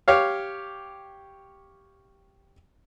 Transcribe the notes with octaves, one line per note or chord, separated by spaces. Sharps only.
G4 C#5 F5